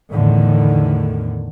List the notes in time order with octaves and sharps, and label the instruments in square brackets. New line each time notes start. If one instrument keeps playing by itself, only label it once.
[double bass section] E2 A2 D3 D#3